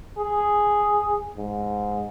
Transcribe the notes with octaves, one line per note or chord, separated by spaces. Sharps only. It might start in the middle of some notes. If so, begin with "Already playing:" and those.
G#4
G#2